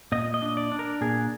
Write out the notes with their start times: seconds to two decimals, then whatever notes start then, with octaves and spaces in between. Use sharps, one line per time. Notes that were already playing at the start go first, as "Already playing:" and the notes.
0.12 A#2 D#5
0.34 D#5
0.42 D4
0.57 D5
0.72 D4
0.79 A#4
1.01 A#2 G#4